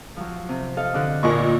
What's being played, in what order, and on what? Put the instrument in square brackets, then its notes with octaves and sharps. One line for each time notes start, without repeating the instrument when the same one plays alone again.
[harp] F3 F#3
C3
A4 D#5 F5
D3 F#4 A4
[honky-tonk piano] A#2 D#5 C#6 [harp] A#3